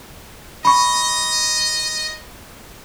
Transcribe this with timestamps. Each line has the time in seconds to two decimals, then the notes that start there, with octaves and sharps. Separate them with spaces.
0.65 D#5 B5 C#6